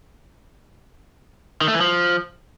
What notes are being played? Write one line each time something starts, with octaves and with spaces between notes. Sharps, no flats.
D#3
A3
E3
F3